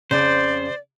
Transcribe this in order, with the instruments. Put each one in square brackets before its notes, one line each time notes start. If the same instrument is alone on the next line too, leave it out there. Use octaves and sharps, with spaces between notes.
[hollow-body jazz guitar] F2 C#3 [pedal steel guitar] C5 [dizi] D5